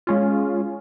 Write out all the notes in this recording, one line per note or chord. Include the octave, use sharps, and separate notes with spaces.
G#3 C#4 F4